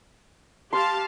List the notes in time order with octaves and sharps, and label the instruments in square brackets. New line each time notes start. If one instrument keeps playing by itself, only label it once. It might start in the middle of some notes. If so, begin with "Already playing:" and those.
[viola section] G4 F5 A5 [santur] C6